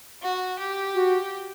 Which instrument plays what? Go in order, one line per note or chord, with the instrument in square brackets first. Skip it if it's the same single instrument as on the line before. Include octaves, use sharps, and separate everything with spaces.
[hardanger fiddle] F#4
G4
[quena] F#4